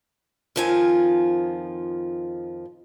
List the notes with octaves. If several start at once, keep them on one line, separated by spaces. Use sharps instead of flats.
F2 D#3 F3 F4 G#5